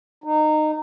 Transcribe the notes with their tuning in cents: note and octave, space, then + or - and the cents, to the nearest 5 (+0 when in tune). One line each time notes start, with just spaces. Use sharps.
D#4 -20